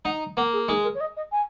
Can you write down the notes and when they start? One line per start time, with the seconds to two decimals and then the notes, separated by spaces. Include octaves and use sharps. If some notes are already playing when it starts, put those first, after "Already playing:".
0.05 D#4 F#5
0.37 A#3 F#5
0.53 G#4
0.68 G#3 D#4
0.84 A#4
0.95 C#5
1.00 D#5
1.17 D#5
1.32 G#5